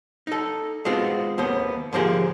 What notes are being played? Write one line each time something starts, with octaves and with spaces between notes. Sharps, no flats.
D#4 A4
G#3 B3 C4 F4 F#4
D#2 B3 C5
G#2 D3 F3 A#3 G4 G#4